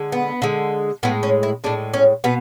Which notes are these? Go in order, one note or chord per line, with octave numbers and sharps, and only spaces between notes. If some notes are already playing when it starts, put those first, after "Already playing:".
Already playing: D3 G#3
B3
D3 G#3
A2 G#3 B3
C#4
E4
A2 G#3 D4
C#4
B2 B3